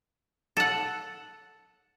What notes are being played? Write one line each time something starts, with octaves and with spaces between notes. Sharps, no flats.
A4 F#5